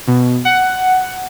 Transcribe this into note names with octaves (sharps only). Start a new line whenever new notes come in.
B2
F#5